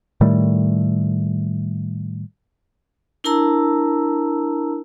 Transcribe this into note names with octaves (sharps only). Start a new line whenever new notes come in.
A2 D#3 G3 A3
D4 E4 A#4 A5 A#5 E6